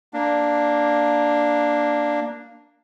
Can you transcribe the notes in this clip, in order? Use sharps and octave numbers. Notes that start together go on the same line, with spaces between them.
A#3 D4